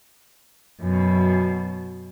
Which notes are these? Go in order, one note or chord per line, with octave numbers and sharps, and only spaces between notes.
F#2 B2